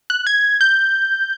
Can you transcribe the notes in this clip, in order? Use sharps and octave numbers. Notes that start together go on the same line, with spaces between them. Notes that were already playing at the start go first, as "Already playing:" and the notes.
F#6
G#6
G6